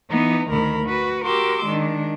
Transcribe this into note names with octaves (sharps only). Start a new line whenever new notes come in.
E3 B3 D#4
D2 D#3 A#4 B5
F#4 B4
F#4 G4 A#4 C6 D6 E6
D#3 G#3 D4